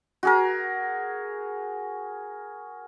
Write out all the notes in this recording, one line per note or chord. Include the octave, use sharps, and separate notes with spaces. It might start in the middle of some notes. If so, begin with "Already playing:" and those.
F#4 G#4 A#4